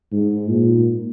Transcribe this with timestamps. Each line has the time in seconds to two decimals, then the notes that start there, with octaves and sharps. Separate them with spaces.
0.12 G#2
0.49 A#2